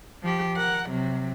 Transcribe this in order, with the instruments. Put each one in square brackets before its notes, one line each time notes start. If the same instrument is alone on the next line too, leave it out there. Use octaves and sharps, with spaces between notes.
[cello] F3 G4
A#4 F#5
C3 F#3